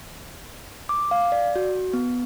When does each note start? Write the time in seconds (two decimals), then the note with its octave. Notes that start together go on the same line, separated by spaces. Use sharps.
0.89 D6
1.11 F5
1.32 D5
1.56 F#4
1.94 B3